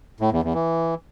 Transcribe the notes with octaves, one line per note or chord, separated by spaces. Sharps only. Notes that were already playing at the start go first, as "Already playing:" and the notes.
A2
E2
E2
E3